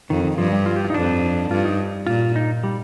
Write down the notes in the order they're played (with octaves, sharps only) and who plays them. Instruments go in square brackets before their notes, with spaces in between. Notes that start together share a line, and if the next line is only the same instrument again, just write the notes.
[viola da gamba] F2 [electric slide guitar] D#3
[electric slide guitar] D#3
[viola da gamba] G2 [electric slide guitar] F3
[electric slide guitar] G3
F4
G4
F4
D#4
[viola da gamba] F2 [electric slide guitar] D4
[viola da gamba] G2 [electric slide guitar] F4
[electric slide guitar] D#4
[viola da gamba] A#2 [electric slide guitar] F4
[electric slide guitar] D#4
G3